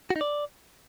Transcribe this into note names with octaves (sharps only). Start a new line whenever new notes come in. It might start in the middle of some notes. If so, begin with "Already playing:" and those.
F#4
D#4
D5